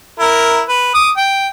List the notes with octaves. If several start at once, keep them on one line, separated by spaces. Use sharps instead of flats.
E4 A#4 A#5
B4
D6 D#6
G5